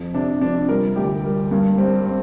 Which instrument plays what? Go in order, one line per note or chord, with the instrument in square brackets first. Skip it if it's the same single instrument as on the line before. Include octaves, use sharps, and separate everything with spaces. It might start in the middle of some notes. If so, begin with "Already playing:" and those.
Already playing: [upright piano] F2
C3 D4
F3 D4
G3 A#4
D2 G4
G3 A#4
G2 A#3
G3 C4
C4